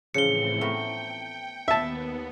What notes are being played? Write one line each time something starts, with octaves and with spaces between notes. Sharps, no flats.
A2 C#3 E3 F3 C4 C#7 G7
A3 B3 A#4 G5
D#2 B3 D5 E5 A5 B5